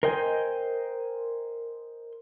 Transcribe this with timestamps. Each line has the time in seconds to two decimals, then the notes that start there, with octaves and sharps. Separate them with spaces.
0.03 A#4 C5 D#5 G5 G#5